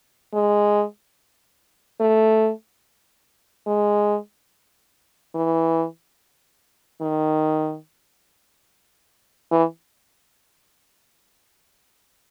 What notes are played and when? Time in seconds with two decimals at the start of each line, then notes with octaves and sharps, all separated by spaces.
0.34 G#3
2.00 A3
3.67 G#3
5.35 E3
7.01 D#3
9.51 E3